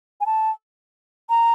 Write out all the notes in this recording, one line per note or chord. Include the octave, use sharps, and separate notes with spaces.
G#5
A5
A#5